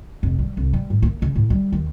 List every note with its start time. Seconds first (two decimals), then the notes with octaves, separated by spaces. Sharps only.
0.23 F1
0.39 G3
0.57 C2
0.73 G3
0.90 A2
1.02 A#3
1.22 C#3
1.36 A2
1.50 G3
1.73 D#2